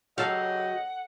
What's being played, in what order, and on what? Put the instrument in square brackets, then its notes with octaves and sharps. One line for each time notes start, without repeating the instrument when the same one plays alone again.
[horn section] C#3 G4 D#5 [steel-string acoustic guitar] F#3 [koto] A4 F5 [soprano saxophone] F#5